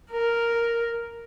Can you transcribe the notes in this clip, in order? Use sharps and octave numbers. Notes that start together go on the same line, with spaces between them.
A#4